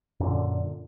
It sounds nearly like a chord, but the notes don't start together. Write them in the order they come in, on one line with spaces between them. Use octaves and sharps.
F#2 A#2 D3